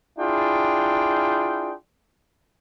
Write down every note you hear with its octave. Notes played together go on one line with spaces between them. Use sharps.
D4 E4 F4 G#4 G5